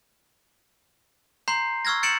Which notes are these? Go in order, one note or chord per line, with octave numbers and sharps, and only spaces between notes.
A#5 C6 G6 C7
C#6 E6 F6 G#6 A#6
G6 A6 C#7 D7 E7 F#7